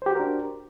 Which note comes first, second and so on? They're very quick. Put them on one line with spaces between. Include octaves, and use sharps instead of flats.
C5 G4 F#4 A#4 D4